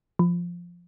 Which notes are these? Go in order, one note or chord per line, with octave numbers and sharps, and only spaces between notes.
F3